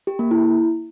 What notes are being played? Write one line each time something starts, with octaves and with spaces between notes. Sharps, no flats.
G4
A#3
E4